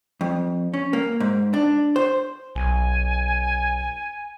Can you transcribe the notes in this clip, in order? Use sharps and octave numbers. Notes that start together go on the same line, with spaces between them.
F2
C#4
A#3
G#2
D4
C5
B1 G#5